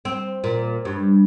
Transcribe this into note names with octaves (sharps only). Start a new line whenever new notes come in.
C4
A#2
G2